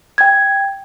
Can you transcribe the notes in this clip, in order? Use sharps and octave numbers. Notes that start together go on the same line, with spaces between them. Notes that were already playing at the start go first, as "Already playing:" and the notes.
G5 G#6